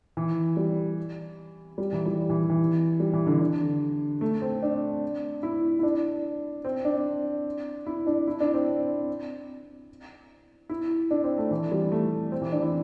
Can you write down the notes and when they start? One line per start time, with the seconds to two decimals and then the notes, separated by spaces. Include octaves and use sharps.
0.17 E3
0.57 G3
1.78 G3
1.93 E3
2.06 G3
2.30 E3
2.50 E3
3.00 G3
3.13 E3
3.27 D3
3.41 D3
4.21 A3
4.42 C4
4.62 D4
5.43 E4
5.79 E4
5.83 D4
6.65 C4
6.85 D4
7.87 E4
8.07 D4
8.27 E4
8.41 D4
8.54 C4
10.69 E4
11.11 D4
11.24 C4
11.38 A3
11.51 E3
11.72 G3
11.92 A3
12.32 C4
12.42 E3
12.52 D4
12.62 E4